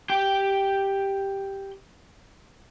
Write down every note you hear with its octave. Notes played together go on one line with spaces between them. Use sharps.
G4 G5